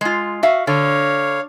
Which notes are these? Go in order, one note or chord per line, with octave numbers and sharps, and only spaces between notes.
G#3 F4
F#4 E5 F5
D3 C#5 F5